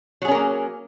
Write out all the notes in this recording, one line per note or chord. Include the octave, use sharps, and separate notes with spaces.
F#3 A#3 C#4 G#4 A#4